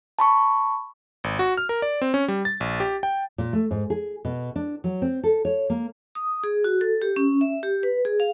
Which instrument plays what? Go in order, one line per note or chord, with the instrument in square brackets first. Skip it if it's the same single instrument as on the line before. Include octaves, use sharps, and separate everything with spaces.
[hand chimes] A5 B5 C#6
[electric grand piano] G#1
F#4
F6
A#4
D5
C4
C#4
G3
A6
A#1
G4
G5
[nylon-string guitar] A#2
A3
G#2
G#4
B2
D4
F#3
C4
A4
C#5
A#3
[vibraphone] D#6
G#4
F#4
A4
G4
C#4
E5
G4
B4
G#4
F5